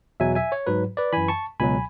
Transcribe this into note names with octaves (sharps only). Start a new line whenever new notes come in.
E2 B2 F#3 E5 G#5
E5 G#5
C#5
G#2 F#3 B4
B4 D5
F#2 E3 G#5 B5
A5 C#6
C#2 B2 F#3 G#5 B5